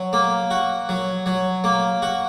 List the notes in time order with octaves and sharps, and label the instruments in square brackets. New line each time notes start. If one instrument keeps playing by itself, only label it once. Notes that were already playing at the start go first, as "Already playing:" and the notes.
Already playing: [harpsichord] F#3
A#3
F#4
F#3
F#3
A#3
F#4